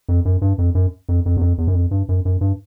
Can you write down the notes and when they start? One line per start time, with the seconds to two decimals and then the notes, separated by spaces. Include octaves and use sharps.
0.09 F2
0.25 F#2
0.42 G2
0.58 F2
0.75 F#2
1.09 F2
1.26 F2
1.37 E2
1.41 F2
1.58 E2
1.68 F#2
1.75 F2
1.91 G2
2.09 F#2
2.25 F#2
2.41 G2